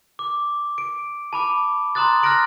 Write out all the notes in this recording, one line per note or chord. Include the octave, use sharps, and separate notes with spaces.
D6
D7
A5 B5 D6
A#5 C6 D#6 F#6 A6
F6 F#6 A6 A#6 D7 F#7